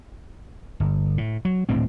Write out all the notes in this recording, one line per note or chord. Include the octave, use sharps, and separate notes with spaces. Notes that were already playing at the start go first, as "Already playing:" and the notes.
G1
A2
F#3
D#1 D2 A2 C4